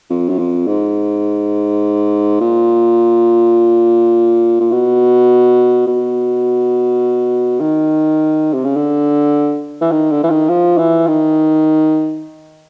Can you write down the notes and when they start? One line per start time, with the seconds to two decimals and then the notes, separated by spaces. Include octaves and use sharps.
0.10 F2
0.29 F#2
0.38 F2
0.67 G#2
2.41 A#2
4.60 A#2
4.72 B2
5.87 B2
7.60 D#3
8.53 C3
8.64 C#3
8.76 D3
9.81 E3
9.91 D#3
10.11 D3
10.24 E3
10.30 D#3
10.49 F3
10.78 E3
11.07 D#3